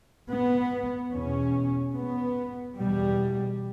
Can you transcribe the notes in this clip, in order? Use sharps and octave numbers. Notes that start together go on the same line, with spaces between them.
B3
E2 B2 C#4
B3
E2 B2 G3